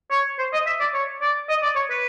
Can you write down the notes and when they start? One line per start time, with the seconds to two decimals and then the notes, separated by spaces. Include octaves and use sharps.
0.11 C#5
0.38 C5
0.53 D#5
0.67 E5
0.80 D5
0.94 C#5
1.21 D5
1.49 D#5
1.63 D5
1.76 C#5
1.90 B4